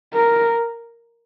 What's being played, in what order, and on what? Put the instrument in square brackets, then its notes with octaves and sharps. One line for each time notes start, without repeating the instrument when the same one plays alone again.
[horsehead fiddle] A#4